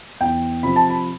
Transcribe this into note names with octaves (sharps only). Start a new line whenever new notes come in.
E2 G5
C3 F3 C4 B5
A5
B5